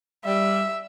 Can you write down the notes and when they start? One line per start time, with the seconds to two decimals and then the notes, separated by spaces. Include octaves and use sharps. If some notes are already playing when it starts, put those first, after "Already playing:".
0.25 G3 E5